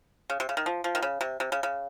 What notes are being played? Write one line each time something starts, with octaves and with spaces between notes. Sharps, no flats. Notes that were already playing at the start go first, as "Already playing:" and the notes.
C#3
C3
C#3
D#3
F3
F3
D#3
C#3
C3
C3
C#3
C#3